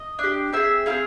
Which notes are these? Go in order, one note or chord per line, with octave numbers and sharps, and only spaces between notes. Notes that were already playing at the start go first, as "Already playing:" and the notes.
Already playing: D#5
D4 G4
C4 E4 G#4 E5
C4 E4 G#4 F5